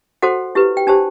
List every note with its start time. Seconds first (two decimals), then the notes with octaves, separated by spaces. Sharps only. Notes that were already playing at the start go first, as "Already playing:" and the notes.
0.22 F#4 A4 C5 F#5
0.55 E4 G4 B4
0.77 G5
0.87 D4 G4 C5 A5